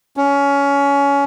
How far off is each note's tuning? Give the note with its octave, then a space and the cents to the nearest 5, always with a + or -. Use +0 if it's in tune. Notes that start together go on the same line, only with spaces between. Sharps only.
C#4 +20